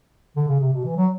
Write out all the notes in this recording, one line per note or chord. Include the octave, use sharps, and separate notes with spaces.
D3
C#3
C3
B2
E3
F#3